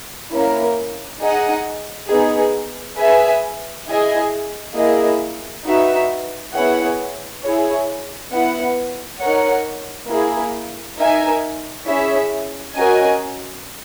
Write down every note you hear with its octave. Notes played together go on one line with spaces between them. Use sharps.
A#3 C#4 E4 A#4
D#4 G#4 D#5 F#5
B3 D#4 G#4
G#4 B4 E5 G#5
E4 G#4 D#5 G#5
A#3 E4 G#4 D#5
D#4 F#4 B4 E5
B3 E4 G#4 C#5 F#5
E4 G#4 C#5
B3 E4 B4 F#5
D#4 A#4 C#5 F#5
A#3 E4 G#4
D#4 A#4 E5 G#5
C#4 E4 G#4 C#5 E5
C#4 F#4 A#4 D#5 G#5